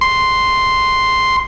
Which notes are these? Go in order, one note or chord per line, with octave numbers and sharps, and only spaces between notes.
C6